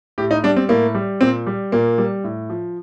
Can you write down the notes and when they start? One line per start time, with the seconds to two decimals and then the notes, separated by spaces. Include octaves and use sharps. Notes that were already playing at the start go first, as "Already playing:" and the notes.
0.18 A2 G4
0.31 D#4
0.44 G3 D4
0.57 C4
0.69 A2 A#3
0.95 G3
1.21 A#2 C4
1.47 G3
1.72 A#2 A#3
1.98 G3
2.24 A2
2.50 F3